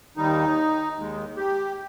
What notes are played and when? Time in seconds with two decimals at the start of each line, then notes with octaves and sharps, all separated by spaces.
0.17 D#2 D#3 G3 D#4
0.96 D#2 D#3 G#3
1.37 G4